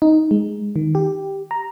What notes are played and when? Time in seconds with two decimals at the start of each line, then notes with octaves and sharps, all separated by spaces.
0.02 D#4
0.31 G#3
0.76 D#3
0.95 G4
1.51 A#5